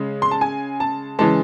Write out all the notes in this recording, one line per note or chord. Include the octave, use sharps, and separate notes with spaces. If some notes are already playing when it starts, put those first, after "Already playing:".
Already playing: C#3 G#3
C6
A5
G#5
A5
C#3 E3 G#3 A5